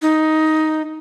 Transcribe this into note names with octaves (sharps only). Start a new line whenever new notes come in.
D#4